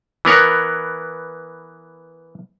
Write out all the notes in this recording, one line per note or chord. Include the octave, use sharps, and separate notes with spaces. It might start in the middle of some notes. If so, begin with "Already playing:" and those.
E3 B3 A#4 C#5